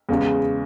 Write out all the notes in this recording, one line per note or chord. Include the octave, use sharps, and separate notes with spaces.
E2 C#3 G#3